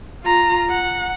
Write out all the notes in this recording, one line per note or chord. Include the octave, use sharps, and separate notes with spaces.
F4 A#5
F#5